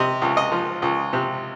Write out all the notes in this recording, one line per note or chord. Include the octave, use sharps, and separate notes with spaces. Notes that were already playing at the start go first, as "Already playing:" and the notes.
Already playing: C3 D#5
C#2
D#5
F3
C#2
C3